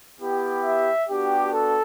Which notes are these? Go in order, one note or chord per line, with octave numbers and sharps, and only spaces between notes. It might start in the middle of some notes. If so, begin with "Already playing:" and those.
B3 E4 G4
E5
B3 D4 F#4 G4
A4